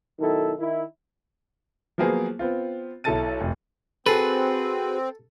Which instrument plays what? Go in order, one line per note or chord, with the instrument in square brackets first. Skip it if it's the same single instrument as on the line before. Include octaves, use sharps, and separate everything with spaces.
[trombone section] B1 D#3 E4 A4
D#3 E4
[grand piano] F3 F#3 A#3 B3 G#4 C5
B3 C4 F4
B1 E4 A4 A5 A6 D#7
F1
[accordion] C4 [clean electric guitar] F#4 G#4 B4 [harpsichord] A4